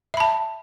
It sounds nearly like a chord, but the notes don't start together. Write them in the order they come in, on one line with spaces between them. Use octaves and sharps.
E5 B5 A5